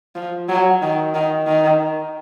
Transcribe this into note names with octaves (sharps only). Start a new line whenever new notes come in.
F3
F#3
D#3
D#3
D#3